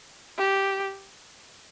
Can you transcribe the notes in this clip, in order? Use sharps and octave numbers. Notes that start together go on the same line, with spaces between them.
G4